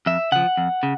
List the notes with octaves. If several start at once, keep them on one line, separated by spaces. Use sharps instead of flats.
F2 E5
C#3 F3 F#5
F2
C#3